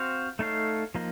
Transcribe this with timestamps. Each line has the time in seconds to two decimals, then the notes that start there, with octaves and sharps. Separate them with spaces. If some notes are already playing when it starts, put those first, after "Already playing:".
Already playing: C4 F#4 C5 F5
0.39 A3 D#4 A4 C#5 F5
0.95 F3 A#3 D#4